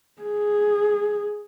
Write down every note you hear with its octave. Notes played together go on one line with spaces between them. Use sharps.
G#4